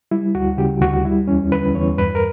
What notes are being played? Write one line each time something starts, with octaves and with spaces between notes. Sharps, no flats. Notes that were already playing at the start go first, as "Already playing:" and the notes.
G3 E4
D2 F#4
C#3 G4
D2 F#4
G3 E4
E2 C#4
D3 B4
E2 C#5
G2 B4
A#4